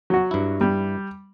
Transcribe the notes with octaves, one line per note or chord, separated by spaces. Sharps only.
F#3 F#4
G2 E4
G3